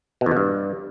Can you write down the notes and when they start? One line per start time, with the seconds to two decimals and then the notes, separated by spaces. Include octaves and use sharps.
0.21 B2
0.26 E2
0.31 B2
0.37 G2